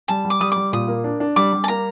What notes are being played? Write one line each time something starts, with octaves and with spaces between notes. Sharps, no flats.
G3 A5
G3
D6
G3 D#6
G3 D6
A#2 D#6
A#3
D4
D4
G3 D6
G3
A5
A#3 A#5